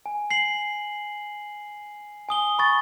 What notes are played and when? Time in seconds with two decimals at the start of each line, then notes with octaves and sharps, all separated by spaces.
0.06 G#5
0.31 C7 F#7
2.29 G#5 D#6 G7
2.58 B5 C#6 A6